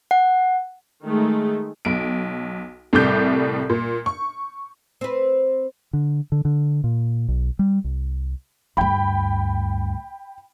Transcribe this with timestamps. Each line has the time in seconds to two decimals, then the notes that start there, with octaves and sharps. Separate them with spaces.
0.11 F#5
1.03 D#3 G#3 A3
1.85 B1 D7
2.93 C2 A2 C3 G3 D6 G6
3.70 A#2
4.06 C#6
5.01 C4 B4
5.93 D3
6.32 D3
6.45 D3
6.84 A#2
7.28 B1
7.59 G3
7.84 C2
8.77 D2 G2 G5 B5